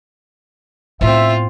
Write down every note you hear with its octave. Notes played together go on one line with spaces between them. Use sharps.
A2 B3 C4 F4 E5